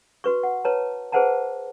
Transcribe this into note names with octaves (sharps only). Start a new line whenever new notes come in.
F#4 B4 C#6
F#5
B4 C#5 A5 A#5
G#4 B4 C5 F#5 A5 A#5